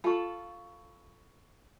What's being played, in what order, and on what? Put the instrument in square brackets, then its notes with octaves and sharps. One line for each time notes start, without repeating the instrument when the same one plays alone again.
[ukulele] F4 A4 [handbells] B5 C#6